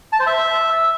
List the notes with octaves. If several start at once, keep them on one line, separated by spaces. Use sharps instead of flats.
A5
C5
E5